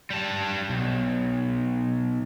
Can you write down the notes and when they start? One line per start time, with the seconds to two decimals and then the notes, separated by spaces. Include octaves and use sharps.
0.10 G3 A5
0.70 B1